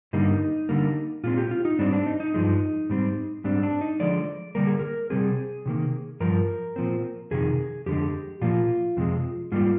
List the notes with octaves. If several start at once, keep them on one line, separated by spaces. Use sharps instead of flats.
G2 D3 G3 A#3 D#4
D3 G3 A#3
A#2 G#3 C4 F4
G4
F4
D#4
G#2 G3 C4 D4
D4
D#4
D#4
G2 F3 G#3
G#2 G3 C4
G#2 G3 C4 D4
D4
D#4
D3 F3 G#3 D5
D3 G3 A#3 A#4
G#4
A#4
C3 G3 C4 G#4
C3 D#3 A#3
G2 F3 A#4
A#2 F3 C4
F2 C3 D#3 G#4
F2 D3 G#3 G4
A#2 F3 A#3 F4
F2 C3 F3 G#3
G#2 G3 A#3 F4